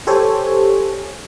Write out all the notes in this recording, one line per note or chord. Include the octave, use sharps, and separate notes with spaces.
G4 A4 C5 C#5 G#5